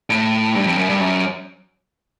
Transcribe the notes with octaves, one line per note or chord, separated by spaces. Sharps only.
A2
G2
F2
F#2
G2
F#2